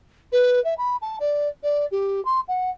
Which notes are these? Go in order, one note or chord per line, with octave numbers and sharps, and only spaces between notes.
B4
E5
B5
A5
D5
D5
G4
C6
F#5